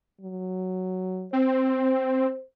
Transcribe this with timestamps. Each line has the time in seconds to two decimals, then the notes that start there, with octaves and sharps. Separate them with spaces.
0.21 F#3
1.33 C4 C5